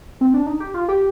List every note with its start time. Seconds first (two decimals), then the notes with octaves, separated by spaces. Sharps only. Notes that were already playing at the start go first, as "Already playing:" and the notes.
0.21 C4
0.34 D4
0.46 D#4
0.60 G4
0.74 F4
0.88 G4